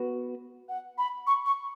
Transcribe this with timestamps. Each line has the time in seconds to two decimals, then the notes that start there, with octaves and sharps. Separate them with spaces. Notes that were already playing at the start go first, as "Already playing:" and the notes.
Already playing: B3 F#4 B4
0.69 F#5
0.98 B5
1.27 C#6
1.46 C#6